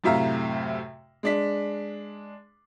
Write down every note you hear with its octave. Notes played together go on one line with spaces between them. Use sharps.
F#2 A2 C3 E5 F5 A#5
G#3 D4 B6